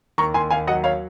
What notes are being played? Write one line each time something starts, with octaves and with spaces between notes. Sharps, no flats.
D#2 A#5 C#6
D#2 G#5 C6
D#2 F5 G#5
F#3 D#5 F#5
C#5 F5